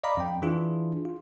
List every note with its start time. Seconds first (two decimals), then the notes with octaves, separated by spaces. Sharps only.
0.04 D5 D#5 F5 A#5 B5 D6
0.17 F2 G5
0.42 E3 D4 E4 F4 G#4
1.05 F4